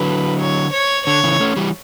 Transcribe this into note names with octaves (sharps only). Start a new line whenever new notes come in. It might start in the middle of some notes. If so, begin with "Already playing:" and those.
Already playing: D3 F#3 B4
C#5
C#5
D3 C#5
C#3 E3
A3 C#4
E3 G3